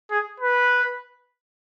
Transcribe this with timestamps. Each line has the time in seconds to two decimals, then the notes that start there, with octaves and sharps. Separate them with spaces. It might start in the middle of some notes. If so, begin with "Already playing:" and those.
0.11 G#4
0.40 B4